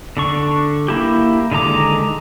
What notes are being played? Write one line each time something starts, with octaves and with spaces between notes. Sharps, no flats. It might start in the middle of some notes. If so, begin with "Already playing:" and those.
D3 D4 C#6
A#3 E4 G4
D3 D#3 G#3 A#5 D6